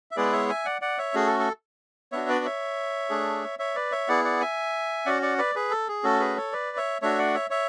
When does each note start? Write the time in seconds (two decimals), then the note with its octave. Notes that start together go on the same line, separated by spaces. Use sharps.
0.11 E5
0.16 G#3 B3 E4 G#4 B4 D5
0.33 C#5 E5
0.49 E5 G#5
0.65 D5 F#5
0.81 D5 F#5
0.98 C#5 E5
1.14 A3 C#4 F#4 G#4
1.26 A4
1.40 A4
2.12 B3 D4 F#4 C#5 E5
2.29 B4 D5
2.45 C#5 E5
3.10 A3 D4 G#4
3.59 C#5 E5
3.75 B4 D5
3.92 C#5 E5
4.08 B3 E4 G#4 D5 F#5
4.25 D5 F#5
4.41 E5 G#5
5.06 C#4 F#4 D5 F#5
5.22 D5 F#5
5.38 B4 D5
5.55 G#4 B4
5.71 A4
5.88 G#4
6.03 A3 C#4 F#4 A4
6.20 G#4 B4
6.36 A4 C#5
6.52 B4 D5
6.77 C#5 E5
7.02 A3 D4 F#4 C#5 E5
7.18 D5 F#5
7.34 C#5 E5
7.50 C#5 E5